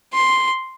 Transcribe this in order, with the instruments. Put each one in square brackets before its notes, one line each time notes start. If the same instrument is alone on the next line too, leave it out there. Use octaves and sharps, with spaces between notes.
[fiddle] C6